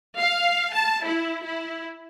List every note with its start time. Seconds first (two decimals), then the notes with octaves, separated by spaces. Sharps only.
0.17 F5
0.73 A5
1.03 E4
1.44 E4